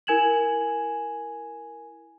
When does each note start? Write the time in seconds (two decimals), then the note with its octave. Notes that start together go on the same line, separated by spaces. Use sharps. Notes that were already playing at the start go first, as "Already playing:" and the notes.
0.07 E4 A#4 G#5 G#6 E7 F#7